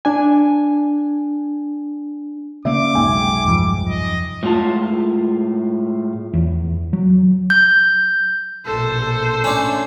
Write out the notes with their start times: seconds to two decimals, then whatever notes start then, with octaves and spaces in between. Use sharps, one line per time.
0.05 D4 G#5
2.65 C#3 A#3 D5 E5 D6
2.95 F1 B1 G#2 E5 G5 G#5
3.45 E2 G2 F3
3.89 D#5
4.43 A2 G#3 F4 A5
6.33 E2
6.93 F#3
7.50 G6
8.66 A#1 B2 A4 C5
8.99 A4
9.44 A2 C#4 D4